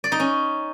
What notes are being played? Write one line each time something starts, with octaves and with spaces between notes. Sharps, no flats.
D5
D#4
C#4